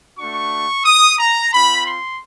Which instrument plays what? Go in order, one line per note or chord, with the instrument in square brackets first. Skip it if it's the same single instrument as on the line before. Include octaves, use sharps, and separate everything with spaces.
[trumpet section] A3 D4 F#4 C#6
D#6
A#5
C4 F4 B5
C6